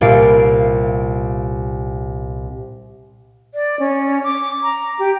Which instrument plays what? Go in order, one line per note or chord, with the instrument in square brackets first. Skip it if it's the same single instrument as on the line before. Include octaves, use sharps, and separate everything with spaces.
[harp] C2 A#2 F5 D7
[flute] D5
C#4
D6
A#5
G4